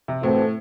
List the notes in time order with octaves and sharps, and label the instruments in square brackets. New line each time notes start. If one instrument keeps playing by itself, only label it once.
[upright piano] C3
[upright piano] A2 [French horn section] E3 C4 F#4 A4